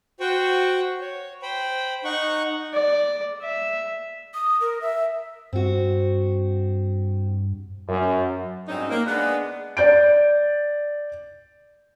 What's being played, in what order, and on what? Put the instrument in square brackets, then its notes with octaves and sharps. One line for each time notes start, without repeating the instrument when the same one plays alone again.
[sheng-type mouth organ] F#4 C5 F#5 G5 C#6
C#5
C5 G5 B5
D#4 F#5 C#6
[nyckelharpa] D5
E5
[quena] D#6
A#4
E5
[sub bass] G2 [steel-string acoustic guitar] C4 F#4
[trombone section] F#2
[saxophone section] G#2 F#3 G3 C4 C#4 D#4
A#3
G#3 B3 D4
[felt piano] D5 G6 D7